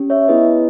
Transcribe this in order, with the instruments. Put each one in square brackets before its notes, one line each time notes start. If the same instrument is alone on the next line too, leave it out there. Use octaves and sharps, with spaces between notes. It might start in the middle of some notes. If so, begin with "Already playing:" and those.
Already playing: [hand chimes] C#4 G4
C#5 E5
B3 E4 G#4 B4 D#5